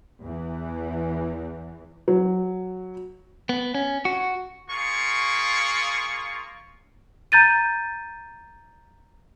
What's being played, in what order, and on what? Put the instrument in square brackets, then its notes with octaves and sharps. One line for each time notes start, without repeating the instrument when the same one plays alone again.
[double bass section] E2 E3
[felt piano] F#3
[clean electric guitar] B3
C#4
F#4
[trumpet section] A#3 F4 G#4 C#6
[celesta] A#5 G6 A6 D#7